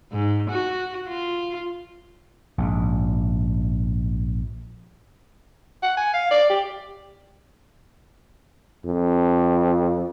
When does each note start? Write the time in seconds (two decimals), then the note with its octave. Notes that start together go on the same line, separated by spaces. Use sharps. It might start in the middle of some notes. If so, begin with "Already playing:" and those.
0.12 G#2
0.50 F#4
1.08 F4
2.58 A#1 G#2
5.83 F#5
5.97 G#5
6.14 F5
6.31 D5
6.50 G4
8.85 F2